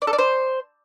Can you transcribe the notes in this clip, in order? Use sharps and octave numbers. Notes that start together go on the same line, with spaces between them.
D5
A4
D5
C5